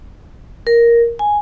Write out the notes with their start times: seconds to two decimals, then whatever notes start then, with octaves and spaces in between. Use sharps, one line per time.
0.67 A#4
1.19 G#5